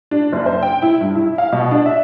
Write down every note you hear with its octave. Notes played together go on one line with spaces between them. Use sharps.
D4
F#1
C5
G5
E4
G2
E4
F5
B2
D4
E5